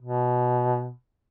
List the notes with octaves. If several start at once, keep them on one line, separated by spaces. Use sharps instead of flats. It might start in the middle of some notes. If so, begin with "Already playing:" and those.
B2